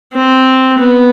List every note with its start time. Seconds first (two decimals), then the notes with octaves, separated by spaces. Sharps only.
0.14 C4
0.78 B3